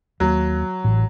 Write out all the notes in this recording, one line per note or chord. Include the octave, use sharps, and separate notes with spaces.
D#2 F#3 A#3
A1 A2